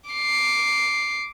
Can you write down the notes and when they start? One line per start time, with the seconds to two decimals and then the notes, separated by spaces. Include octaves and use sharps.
0.10 D6 C7